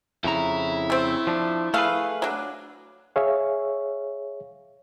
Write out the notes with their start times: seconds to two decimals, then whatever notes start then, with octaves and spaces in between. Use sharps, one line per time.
0.24 F2 C#3 E4 A#5
0.90 A3 C4
1.27 F3 D4
1.74 A3 G#4 A4 B4 F5
2.22 F#3 D4
3.16 G#4 C#5 E5 F5